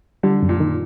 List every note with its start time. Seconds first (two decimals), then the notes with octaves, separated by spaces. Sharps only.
0.23 D3 G3
0.43 F#2
0.49 A#2
0.60 D#3